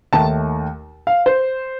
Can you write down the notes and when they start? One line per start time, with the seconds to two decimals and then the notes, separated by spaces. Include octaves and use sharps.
0.13 D#2 D#3 A3 A5
1.07 F5
1.26 C5